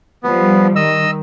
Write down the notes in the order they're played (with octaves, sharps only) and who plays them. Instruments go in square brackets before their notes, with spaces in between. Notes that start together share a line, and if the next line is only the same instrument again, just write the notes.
[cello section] F3 G3 [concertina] B3
[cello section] D#3 [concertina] D#5 E6